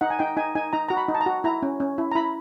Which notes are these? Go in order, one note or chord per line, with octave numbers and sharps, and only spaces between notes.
D#4 F#5
G#5
D#4 G5
D#4 G#5
D#4 G#5
D#4 A#5
F#4 A#5
B5
D#4
A5
A#5
F#4
E4 A#5
C#4
C#4
E4
A#5
E4 B5